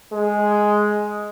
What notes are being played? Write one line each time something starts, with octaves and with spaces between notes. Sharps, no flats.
G#3